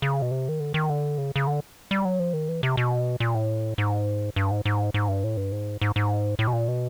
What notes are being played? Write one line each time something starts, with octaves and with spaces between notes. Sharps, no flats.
C#3
B2
C3
D#3
D3
D#3
D3
C#3
C#3
D3
G3
F#3
F3
D#3
E3
C3
B2
A#2
A2
G#2
G2
G#2
G#2
G#2
G2
A2
G2
G#2
G#2
G#2
A2
B2
A#2
B2